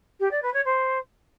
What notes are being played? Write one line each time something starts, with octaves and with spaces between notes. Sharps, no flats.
G4
D5
B4
C#5
C5